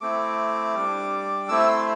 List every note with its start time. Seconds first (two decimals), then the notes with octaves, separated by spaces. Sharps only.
0.01 A3 C4 E4 D6
0.75 G3 D4
1.49 A3 C4 E4 E6
1.68 C6